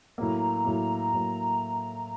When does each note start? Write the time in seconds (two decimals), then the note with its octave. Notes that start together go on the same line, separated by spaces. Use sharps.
0.18 A2 F#3 A#3 A#5
0.65 A2 F#3 A#3
1.13 A2 F#3 A#3